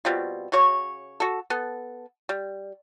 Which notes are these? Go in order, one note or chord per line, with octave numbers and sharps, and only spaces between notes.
B2 G3 C4 F4
C#3 F#4 C#5 C#6
F#4 A4
B3 A4
G3